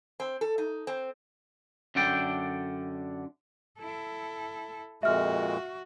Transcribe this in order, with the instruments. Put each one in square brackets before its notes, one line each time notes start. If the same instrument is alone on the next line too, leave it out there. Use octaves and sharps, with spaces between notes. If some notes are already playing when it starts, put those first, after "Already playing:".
[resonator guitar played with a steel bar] C4
A4
D#4
C4
[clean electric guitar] F#2 D3 D4 A4 D5 G5
[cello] E4 A4
[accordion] F2 A#2 G#3 [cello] F#4 [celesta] E5 F6